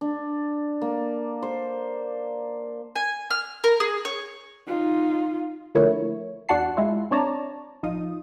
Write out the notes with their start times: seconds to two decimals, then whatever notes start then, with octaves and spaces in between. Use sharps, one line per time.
0.01 D4
0.82 A#3
1.43 C5
2.96 G#5
3.31 F6
3.64 A#4
3.80 G#4
4.05 C#5
4.67 D#4 F4
5.75 D3 F3 A3 A#3 E4 C#5
6.49 E2 D4 F#4 F#5 A5 C7
6.77 G#3 E4 F4
7.11 C4 D4 C#5 D5 A5 A#5
7.83 A1 F3 D#4 F4 D#6